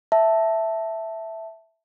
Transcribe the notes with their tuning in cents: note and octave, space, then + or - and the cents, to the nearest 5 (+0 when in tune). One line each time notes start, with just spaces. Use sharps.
E5 +0 A5 +0